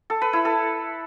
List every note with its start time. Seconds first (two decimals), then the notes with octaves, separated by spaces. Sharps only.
0.10 A4
0.22 B4
0.33 E4
0.45 A4